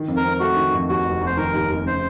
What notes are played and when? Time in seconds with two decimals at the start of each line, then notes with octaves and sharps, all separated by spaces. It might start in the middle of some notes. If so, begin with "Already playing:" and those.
Already playing: D#3
0.08 F2
0.16 A#4
0.24 C4
0.40 A3 F#4
0.56 D#3
0.73 F2
0.89 D#2 F#4
1.04 F1
1.21 F1
1.26 C5
1.37 D#3 A#4
1.54 D#2
1.69 F1
1.86 C#3 C5